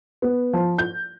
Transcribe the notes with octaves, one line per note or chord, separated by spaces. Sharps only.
B3
F3
G6